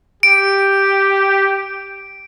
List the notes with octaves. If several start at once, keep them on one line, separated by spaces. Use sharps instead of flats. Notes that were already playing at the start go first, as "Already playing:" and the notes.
G4 D7